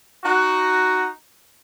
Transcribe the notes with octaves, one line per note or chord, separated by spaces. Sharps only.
D#4 F#4